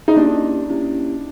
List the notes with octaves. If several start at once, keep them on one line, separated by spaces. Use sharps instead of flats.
D#4
A#3 C#4 D4 E4 G4
A#3 C#4 E4 G4